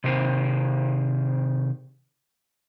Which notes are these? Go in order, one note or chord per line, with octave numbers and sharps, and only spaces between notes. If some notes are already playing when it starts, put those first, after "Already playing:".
C3 D#3 C5